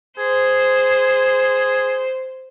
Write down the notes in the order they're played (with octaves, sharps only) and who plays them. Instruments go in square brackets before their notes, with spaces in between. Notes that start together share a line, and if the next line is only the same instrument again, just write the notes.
[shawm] G#4 [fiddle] C5